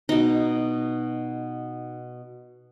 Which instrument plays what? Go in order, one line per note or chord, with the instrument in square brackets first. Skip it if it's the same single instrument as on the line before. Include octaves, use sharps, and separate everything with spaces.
[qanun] B2 D#4